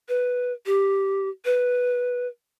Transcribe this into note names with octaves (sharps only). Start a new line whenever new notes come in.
B4
G4
B4